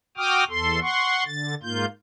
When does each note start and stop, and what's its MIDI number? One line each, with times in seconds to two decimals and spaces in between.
0.17 0.44 66
0.17 0.44 79
0.17 0.44 86
0.17 0.44 87
0.17 0.44 89
0.49 0.80 40
0.49 0.80 69
0.49 0.80 84
0.82 1.24 78
0.82 1.24 84
0.82 1.24 85
1.26 1.55 50
1.26 1.55 93
1.63 1.85 44
1.63 1.85 58
1.63 1.85 65
1.63 1.85 91